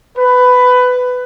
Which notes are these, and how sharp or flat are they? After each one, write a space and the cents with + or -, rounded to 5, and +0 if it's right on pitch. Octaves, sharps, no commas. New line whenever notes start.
B4 +15